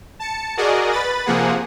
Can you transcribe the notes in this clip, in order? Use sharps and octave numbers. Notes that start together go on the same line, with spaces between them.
A5 C#7
F#4 G#4 A#4 D5 D#5
B4 B5 A6
C3 F3 A#3 G#4 F#5